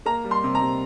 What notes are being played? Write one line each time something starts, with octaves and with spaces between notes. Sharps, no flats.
A#3 A#5
G3
C6
C3
A#5
C3